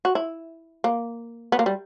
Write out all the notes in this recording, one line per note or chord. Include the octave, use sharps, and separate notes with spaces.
F#4
E4
A#3
B3
A#3
G3